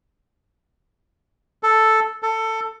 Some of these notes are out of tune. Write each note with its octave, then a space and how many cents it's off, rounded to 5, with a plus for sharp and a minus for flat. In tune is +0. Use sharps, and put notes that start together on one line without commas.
A4 +0
A4 +15